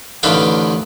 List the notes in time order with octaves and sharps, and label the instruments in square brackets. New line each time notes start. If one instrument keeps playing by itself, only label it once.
[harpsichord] A1 D3 D#3 B4 F5 G5